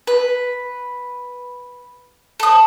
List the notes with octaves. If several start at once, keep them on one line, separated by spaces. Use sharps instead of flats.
B4
A4 D#6